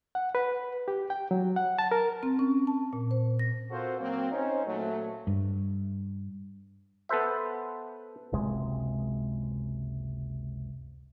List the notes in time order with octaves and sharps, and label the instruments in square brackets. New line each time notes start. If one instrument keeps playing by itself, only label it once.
[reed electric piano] F#5
B4
G4
G5
F#3
F#5
A5
A#4
[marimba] C4
C#4
A5
A#2
C5
A#6
[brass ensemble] C4 F4 F#4 A4 A#4 C5
F#3 A#3 C4
C#4 D#4 C5 C#5
A#2 F#3 A3
[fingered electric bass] G2
[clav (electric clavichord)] B3 A4 B4 C5 E5
[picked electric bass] F#1 C#2 C3 G#3